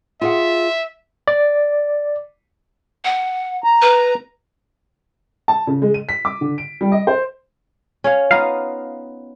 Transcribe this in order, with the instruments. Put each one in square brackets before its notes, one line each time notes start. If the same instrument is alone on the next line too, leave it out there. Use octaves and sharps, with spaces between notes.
[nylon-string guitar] F4 G#4 F#5 [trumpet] E5
[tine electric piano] D5
[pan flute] F#5
[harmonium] A#5
[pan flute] B4
[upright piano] A5
C#3
G#3
D#7
B6
D6
D3
D7
G3
D#5
C5
[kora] C#4 C#5 F5
[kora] B3 D#4 F4 [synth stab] F5